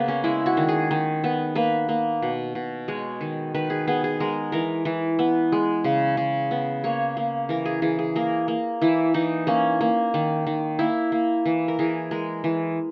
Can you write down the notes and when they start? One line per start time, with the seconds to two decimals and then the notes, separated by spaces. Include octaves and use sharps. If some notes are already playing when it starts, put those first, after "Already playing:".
Already playing: C#3 A#3 B3
0.08 C#4
0.24 G#3 E4
0.46 F#4
0.57 D#3
0.68 G#4
0.91 D#3
1.24 B3
1.55 A#3 B4
1.89 A#3
2.22 B2
2.55 B2
2.88 G#3 C#5
3.21 D#3
3.54 D#3 B4
3.70 G#4
3.87 B3 G#4
4.04 G#4
4.20 G#3 A#4
4.52 E3 A#4
4.85 E3
5.19 B3
5.52 G#3
5.84 C#3
6.17 C#3
6.51 B3
6.84 A#3 C#5
7.17 A#3
7.49 E3 A#4
7.65 G#4
7.82 E3 G#4
7.99 G#4
8.16 A#3 A#4
8.48 A#3
8.81 E3 E4
9.14 E3 D#4
9.47 A#3 C#4
9.81 A#3
10.14 D#3
10.47 D#3
10.79 A#3 E4
11.12 A#3
11.46 E3
11.68 A#4
11.79 E3 G#4
12.11 G#3 A#4
12.44 E3